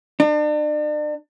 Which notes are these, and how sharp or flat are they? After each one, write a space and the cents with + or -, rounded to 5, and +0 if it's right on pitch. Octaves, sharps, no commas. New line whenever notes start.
D4 +40